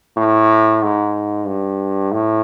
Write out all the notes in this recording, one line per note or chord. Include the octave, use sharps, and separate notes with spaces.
A2
G#2
G2
A2